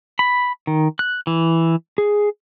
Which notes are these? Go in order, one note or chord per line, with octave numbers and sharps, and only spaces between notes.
B5
D#3
F#6
E3
G#4